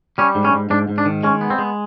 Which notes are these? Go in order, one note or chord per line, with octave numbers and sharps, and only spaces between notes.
G3 C#4
G#2
C#4
G#2
G#2 D4
G#2
D4
D#3
G#3 C#4
B3
C4
G#3